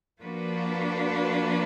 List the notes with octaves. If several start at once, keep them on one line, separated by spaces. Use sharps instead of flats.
F3 A#3 D4 F#4 B4